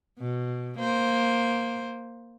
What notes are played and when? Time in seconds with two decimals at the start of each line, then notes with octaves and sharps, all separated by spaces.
0.20 B2
0.79 A#3 C5